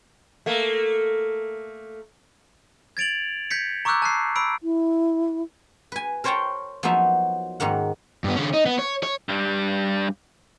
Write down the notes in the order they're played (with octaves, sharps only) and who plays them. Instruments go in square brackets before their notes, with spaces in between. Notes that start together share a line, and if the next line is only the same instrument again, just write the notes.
[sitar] A3 A#3
[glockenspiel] G#6 A6 D7 F7 F#7
G6 G#6 B6 C#7
A#5 C#6 D6 E6 F#6 G6
A5 F#6 C7
B5 E6 D7
[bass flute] E4
[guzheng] B4 G#5
A#4 C5 C#5 G5 A5 A#5
F3 F#3 A#3 B3 D#4 E5
G#2 D#3 A#3 F#5
[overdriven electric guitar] G2 B3
D3 C#4
D#4
B3
C#5
C#5
[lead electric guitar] G2 G3